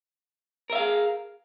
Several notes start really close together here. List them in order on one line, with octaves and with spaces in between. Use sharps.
A#4 E5 F5 G#4